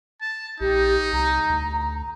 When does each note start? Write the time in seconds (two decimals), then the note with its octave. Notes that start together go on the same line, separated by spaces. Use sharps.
0.21 A5
0.61 A#1 D#4 G4
1.13 C2 A#5
1.50 D2